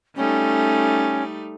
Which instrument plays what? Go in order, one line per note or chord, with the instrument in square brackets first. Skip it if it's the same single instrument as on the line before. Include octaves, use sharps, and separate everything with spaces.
[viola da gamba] G3 A3 D#4 [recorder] C#4